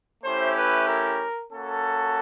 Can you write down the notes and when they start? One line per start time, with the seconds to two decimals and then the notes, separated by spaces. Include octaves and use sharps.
0.23 A3 C#4 E4 G4 C5
0.56 B4
0.87 A#4
1.52 A#3 C#4 F#4 A4